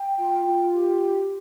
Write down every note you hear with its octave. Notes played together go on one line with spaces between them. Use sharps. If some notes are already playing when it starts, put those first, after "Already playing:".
Already playing: G5
F4
F4
G4